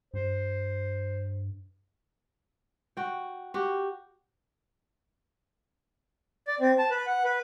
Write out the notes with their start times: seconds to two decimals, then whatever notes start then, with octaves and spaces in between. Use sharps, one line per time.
0.14 G2 C5
2.97 F#4 G5
3.54 F#4 G4
6.48 D5
6.60 C4
6.79 A5
6.90 B4
7.06 F#5
7.24 B4